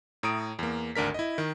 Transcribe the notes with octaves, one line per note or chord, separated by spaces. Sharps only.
A2 A#5 D#6 D7
E2 A#3
G#1 D2 D4 A#4 B6
E4 D#5
D#3